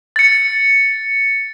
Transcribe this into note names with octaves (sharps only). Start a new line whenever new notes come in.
A6 C#7